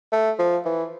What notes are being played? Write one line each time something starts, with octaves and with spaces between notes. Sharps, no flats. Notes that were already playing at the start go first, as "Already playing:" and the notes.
A3
F3
E3